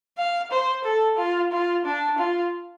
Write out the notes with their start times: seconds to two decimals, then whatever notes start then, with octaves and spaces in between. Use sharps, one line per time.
0.17 F5
0.51 C5
0.84 A4
1.17 F4
1.52 F4
1.85 D4
2.18 F4